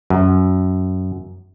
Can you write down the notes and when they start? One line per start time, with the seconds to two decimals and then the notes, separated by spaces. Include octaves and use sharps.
0.10 F#2